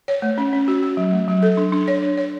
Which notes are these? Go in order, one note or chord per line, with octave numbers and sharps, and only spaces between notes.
C#5
A3
C#4
C#4
F#4
F#4
F#3
A3
F#3
A4
D4
D4
C#5
D4
C#5